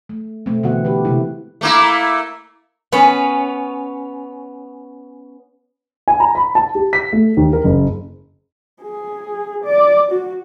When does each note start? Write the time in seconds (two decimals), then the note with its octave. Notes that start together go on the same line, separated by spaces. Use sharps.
0.09 A3
0.46 B2 A3 C4
0.63 B2 D3 E3 B3 F#4 F#5
0.85 G4 B4
1.05 C3 G#3 E4
1.61 A3 A#3 E4
2.92 B3 C#4
6.08 G#5
6.20 A#5
6.35 B5
6.55 A5
6.75 G4
6.93 B6
7.13 A3
7.37 D#2
7.53 A#4
7.64 F#1
8.82 G#4
9.64 D5
10.12 F#4